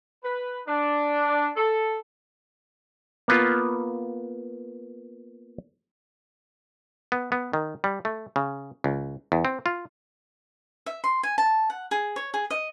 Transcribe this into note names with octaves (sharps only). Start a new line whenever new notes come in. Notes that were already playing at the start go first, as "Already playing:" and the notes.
B4
D4
A4
A#3 B3 F4
B3
B3
D#3
G3
A3
C#3
C#2
E2
C4
F4
E5
C6
G#5
A5
F#5
G#4
C#5
G#4
D#5